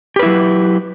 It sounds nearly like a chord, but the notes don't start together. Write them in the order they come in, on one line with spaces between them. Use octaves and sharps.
G4 B4 E4 F#3